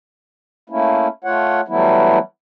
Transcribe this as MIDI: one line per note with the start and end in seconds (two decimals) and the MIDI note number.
0.70 1.08 57
0.70 1.08 58
0.70 1.08 61
0.70 1.08 64
1.24 1.61 57
1.24 1.61 65
1.24 1.61 73
1.24 1.61 78
1.68 2.19 52
1.68 2.19 54
1.68 2.19 55
1.68 2.19 57
1.68 2.19 59
1.68 2.19 64